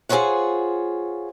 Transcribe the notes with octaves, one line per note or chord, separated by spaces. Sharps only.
F4 G#4 A4 C5 C#5 F#5